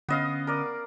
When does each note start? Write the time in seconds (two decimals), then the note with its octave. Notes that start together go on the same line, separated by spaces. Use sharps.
0.09 D3 B3 C#4 D#5 F5
0.47 A#4 D5